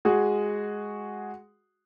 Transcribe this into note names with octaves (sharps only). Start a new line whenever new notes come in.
G#3 F#4 G#4